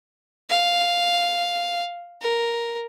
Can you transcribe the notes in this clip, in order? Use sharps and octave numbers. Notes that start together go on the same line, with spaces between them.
F5
A#4